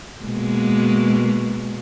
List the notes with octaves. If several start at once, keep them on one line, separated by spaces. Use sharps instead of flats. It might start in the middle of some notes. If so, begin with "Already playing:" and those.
B2 G#3 A#3